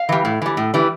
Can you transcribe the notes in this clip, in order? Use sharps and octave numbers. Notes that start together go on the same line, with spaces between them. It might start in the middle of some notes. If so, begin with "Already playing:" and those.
Already playing: F5
E3 G3
A2
E3 G3
A2
E3 G3